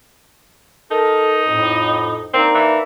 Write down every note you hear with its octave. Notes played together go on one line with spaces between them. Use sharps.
D#4 A4 A#4
F2 A2
A#3 C4 D4 D#4
E3